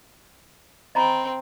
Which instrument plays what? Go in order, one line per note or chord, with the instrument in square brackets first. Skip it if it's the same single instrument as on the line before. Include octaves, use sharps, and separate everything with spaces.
[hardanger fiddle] C4 [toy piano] D#5 A#5 B5